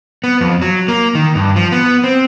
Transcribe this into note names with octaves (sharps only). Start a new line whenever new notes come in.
B3
F2
F#3
A#3
D#3
G2
F3
B3
C4